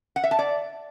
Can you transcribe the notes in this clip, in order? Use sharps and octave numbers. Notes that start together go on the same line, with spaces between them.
F#5
E5
A5
D5